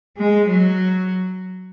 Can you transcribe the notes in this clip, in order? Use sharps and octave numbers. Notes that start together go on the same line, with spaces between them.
G#3
F#3